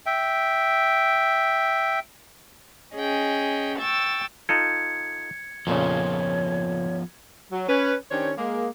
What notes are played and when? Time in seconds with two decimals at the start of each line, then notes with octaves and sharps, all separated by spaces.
0.06 E5 G5
2.94 C#4 G#4 D#5 G5
3.77 G5 C#6 E6 A6
4.49 D#4 F4 A4 G#6 C#7
5.67 F2 A#2 C#3 F3 B3 C#5
7.51 F#3
7.68 C#4 B4
8.11 D#3 C#4 D4 G4 C5 C#5
8.38 G#3 A#3